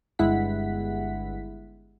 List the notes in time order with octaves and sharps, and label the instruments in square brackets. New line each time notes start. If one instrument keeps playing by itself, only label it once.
[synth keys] G1 G#3 E4 F#5 B6